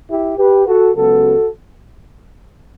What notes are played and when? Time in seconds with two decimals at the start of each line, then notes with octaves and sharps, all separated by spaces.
0.10 E4 G4
0.38 G4 B4
0.67 F#4 A4
0.95 C#2 C#3 F#3 B3 F#4 A4